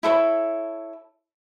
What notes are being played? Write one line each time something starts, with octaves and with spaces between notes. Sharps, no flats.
E4 A4 C5 C#5